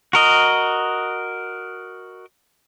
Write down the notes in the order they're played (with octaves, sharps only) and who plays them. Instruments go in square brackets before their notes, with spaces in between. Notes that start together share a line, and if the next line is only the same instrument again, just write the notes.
[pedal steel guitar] F#4 A#4 D#5